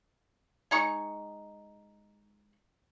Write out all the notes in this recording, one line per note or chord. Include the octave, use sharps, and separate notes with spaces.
G#3 D#4 C#6